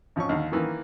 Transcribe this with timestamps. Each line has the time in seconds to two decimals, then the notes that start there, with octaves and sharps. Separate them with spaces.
0.16 G#1 F3 C#4 C#6
0.29 D#2 D3 F5
0.52 D#3 E3 A#3